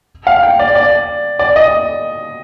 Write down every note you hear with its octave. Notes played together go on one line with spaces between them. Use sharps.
F5
G5
D5
D5
D5
D#5